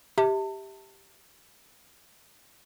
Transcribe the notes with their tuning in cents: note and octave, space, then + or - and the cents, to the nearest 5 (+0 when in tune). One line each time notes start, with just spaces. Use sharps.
G4 +0 E5 -25 A5 +35